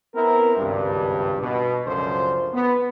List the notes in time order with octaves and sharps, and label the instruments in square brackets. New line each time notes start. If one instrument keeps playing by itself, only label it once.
[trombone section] B3 C4 E4 A#4
G#1 C#2 G2
B2
C#2 F#2 D3 F3 C5
B3